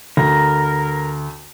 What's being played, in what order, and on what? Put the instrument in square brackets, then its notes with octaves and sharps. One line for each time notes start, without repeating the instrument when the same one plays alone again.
[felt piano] D2 [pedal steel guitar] A#4